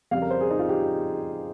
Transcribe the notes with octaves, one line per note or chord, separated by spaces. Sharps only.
F2 C#3 G3 F5
A#4
C5
G#4
D#4
F4
G4